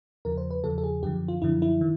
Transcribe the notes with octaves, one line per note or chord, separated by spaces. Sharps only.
E2 C#3 F3 A#4
C5
B4
E2 C#3 F3 A4
A4
G#4
F#2 D3 F3 G4
F4
F#2 D3 F3 E4
E4
D#3